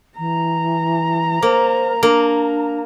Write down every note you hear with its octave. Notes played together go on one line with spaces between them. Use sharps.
E3 A#5
A#3 C5
A#3 D4